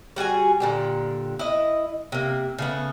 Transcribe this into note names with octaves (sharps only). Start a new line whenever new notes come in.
G3 F#4 G#4 G#5
A#2 D3 G4
E4 D#5
C3 A#3
C#3 A3 B3